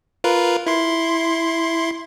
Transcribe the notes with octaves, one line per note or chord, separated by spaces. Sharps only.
F4 A#4 B4
E4 C6